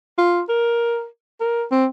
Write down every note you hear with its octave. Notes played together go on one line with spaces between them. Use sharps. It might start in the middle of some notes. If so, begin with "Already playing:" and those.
F4
A#4
A#4
C4